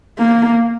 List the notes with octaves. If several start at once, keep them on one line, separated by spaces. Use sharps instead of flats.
A#3